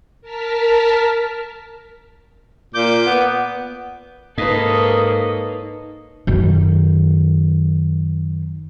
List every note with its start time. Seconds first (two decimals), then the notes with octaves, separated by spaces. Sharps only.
0.21 A#4 A5 F6 B6
2.74 A#2 D6 G6
3.06 B3
4.38 G#2 A#3 D#4 A4 B4 C#5 D#6
6.27 F#2 D#3